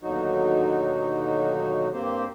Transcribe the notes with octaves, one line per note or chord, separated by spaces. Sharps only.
D#2 B2 D3 F#3 D#4 F#4
G2 A#3 C4 G4 C5